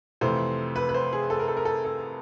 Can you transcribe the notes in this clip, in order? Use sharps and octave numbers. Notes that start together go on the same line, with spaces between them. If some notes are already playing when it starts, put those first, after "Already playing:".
F2 C3 E3 A3 C5
B4
B4
C5
G#4
A4
A#4
A4
A#4
A4
A4